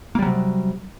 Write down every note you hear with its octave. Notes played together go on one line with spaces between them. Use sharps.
C3 F#3 G3 A#3